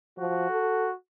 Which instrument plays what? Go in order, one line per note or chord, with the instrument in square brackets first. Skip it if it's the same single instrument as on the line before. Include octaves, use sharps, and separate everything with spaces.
[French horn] F3 [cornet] F#4
[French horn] A4